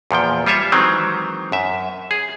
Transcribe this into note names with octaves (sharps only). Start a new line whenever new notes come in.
E2 A#2 F3 G5
G3 F4 C#5 E5
D#3 E3 F#3 G#3 C4
F#2 E5
G#4